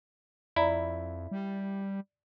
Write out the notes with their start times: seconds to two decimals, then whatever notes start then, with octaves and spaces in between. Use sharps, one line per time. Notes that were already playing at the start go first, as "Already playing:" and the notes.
0.56 F2 E4 D5 A#5 B5
1.31 G3